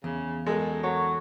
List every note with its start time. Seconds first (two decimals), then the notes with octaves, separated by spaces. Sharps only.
0.04 E2 C#3
0.46 F#2 G#3 A4
0.83 F#3 C#5